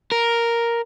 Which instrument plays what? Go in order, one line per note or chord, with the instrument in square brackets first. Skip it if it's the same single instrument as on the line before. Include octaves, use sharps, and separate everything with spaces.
[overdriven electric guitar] A#4